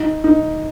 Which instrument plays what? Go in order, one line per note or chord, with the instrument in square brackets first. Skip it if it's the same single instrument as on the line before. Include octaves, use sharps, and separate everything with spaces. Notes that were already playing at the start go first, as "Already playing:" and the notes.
Already playing: [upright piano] D#4
D#4